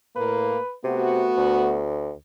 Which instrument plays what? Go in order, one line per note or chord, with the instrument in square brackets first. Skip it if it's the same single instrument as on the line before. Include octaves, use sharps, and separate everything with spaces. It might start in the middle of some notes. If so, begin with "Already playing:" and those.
[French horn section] A2 A#3 [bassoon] B4
[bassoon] C3 [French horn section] A3 B3 F#4
[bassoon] D2